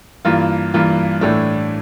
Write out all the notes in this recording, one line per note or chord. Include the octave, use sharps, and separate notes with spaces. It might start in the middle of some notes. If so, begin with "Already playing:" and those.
G2 E3 A#3 F4
G2 E3 A#3 F4
A2 E3 A3 D4